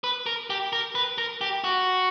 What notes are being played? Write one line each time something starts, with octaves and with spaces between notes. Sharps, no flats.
B4
A#4
G4
A#4
B4
A#4
G4
F#4